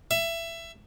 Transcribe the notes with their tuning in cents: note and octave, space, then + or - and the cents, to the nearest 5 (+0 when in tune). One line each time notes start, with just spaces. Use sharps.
E5 +20